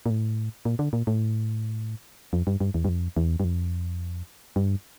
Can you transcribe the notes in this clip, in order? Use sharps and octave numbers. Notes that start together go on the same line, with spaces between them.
A#2
A2
A#2
D3
A#2
A2
F2
G2
G2
E2
G2
F2
E2
G2
F2
G2